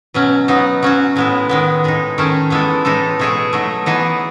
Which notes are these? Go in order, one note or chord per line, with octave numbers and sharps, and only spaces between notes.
B2 F#3 C#4
F#3 B3 D#4
F#3 C#4 F#4
A2 G#3 B3 E4
D#3 G#3 B3
A2 G#3 D#4
D#3 A3 C#4
E3 G#3 B3 E4 A4
A2 E3 G#3 D#4 A4
B2 A3 E4 G#4 C#5
F#3 A3 D#4
E3 B3 D#4 G#4